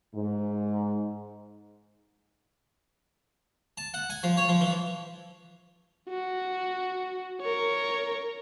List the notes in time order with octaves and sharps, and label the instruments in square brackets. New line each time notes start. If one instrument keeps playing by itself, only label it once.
[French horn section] G#2
[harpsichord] A5
F#5
G#5
F3
C#5
F3
E3
[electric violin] F#4
A#4 C#5